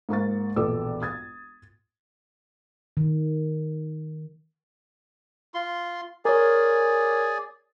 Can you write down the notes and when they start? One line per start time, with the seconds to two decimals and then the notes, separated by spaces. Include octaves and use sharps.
0.09 G#2 A#3 C#6 A6
0.56 E1 A#1 A4 B4 D6 E6
1.02 D#6 G#6 A6
2.97 D#3
5.54 F4 C6
6.25 G#4 A#4 C#5 D5 G#5